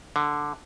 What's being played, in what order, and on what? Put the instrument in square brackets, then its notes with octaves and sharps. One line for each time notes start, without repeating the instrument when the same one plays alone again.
[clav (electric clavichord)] D3